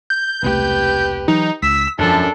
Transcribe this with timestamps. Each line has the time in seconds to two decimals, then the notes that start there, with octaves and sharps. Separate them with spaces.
0.10 G6
0.43 E1 C2 A3 G4 B4
1.28 E3 F#3 D#4
1.62 C#2 E6 B6
1.99 E1 F#2 F3 D4 A4